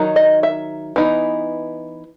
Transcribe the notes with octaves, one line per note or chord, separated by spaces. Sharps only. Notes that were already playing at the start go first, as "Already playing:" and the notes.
Already playing: D#3 F#3 D#4
D#5
E5
E3 B3 D#4